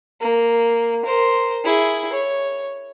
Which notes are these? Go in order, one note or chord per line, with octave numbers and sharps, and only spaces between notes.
A#3
A#4 C5
E4 G#4
C#5